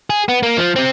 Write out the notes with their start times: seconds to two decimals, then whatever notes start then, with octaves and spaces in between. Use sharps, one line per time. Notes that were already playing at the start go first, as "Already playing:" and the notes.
0.10 G#4
0.29 B3
0.43 A#3
0.58 F3
0.76 C3 C4